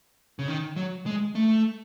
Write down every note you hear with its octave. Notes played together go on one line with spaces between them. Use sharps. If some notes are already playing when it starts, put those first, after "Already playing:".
C#3
D#3
F#3
G#3
A3